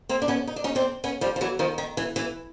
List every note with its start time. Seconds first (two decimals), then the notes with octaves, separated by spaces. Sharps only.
0.09 A#3 C4
0.22 D4
0.28 B3 C#4
0.47 D#4
0.56 D4
0.64 C#4 D#4
0.75 C4 D4
1.04 B3 C#4
1.21 F3 G3
1.36 F3
1.41 E3 F#3
1.59 D#3 F3
1.78 D#3
1.97 E3
2.16 E3